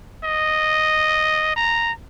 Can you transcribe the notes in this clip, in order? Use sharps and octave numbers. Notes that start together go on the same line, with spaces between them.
D#5
A#5